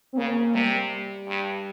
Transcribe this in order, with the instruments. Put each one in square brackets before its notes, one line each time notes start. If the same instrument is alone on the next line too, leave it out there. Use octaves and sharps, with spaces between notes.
[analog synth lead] C4
[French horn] C#3 [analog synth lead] A#3
[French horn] C3 [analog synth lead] G3
[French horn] G2